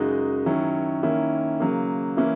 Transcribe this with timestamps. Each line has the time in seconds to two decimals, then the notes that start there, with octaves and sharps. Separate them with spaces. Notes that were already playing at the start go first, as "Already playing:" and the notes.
Already playing: F#2 C#3 G#3 D#4 F#4
0.46 D#3 F#3 C#4 E4
1.03 D#3 A#3 C#4 E4
1.60 C#3 F#3 A#3
2.17 E3 A#3 C#4 E4